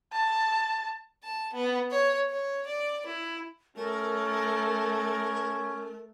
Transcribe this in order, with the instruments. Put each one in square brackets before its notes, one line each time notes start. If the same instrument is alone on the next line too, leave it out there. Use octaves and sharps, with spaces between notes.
[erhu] A5
[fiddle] A5
B3
C#5
C#5
D5
E4
[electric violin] A3 [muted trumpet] C#4 [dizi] A#4